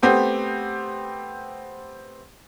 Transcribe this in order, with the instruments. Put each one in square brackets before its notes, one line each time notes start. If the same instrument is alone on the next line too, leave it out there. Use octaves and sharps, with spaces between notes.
[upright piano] A3 B3 C4 G4